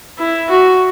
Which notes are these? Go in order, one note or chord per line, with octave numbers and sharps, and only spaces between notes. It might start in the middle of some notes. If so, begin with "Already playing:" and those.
E4
F#4